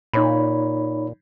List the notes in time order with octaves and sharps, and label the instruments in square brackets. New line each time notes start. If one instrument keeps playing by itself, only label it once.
[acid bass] A#2 [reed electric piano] D#4 C#5 B5